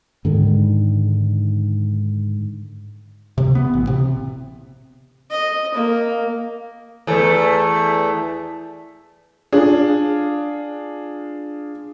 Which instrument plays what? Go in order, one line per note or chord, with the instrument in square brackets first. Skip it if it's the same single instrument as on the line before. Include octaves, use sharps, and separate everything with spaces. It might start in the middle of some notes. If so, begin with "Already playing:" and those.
[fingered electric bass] G#2 D3 D#3 G#3
[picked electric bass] C3
B3
A1
C3
[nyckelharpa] D#5
A#3
[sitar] E2 A3
[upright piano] D4 F4 G#4